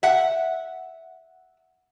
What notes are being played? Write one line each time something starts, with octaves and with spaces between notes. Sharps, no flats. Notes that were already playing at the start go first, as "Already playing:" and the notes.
E5 F#5